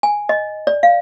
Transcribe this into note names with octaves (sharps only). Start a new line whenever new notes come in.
G#5
D#5
D5
F5